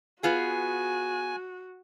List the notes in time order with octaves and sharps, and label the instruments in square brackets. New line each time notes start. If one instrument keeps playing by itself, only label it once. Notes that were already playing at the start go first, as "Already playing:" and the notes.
[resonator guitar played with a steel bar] B3 F4 G#4 [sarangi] F#4 [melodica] G#5